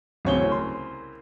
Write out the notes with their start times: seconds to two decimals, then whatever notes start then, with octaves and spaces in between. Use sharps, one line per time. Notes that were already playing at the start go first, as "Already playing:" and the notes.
0.25 D1 C2 C#3 C4 C#5 G7
0.48 A#4 C6